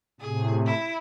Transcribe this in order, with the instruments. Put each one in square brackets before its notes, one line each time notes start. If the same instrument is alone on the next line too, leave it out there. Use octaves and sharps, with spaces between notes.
[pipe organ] A2 C3 [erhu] G#4
[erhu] E4